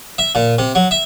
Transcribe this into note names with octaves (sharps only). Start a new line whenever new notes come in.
E5
A#2
C3
F#3
E5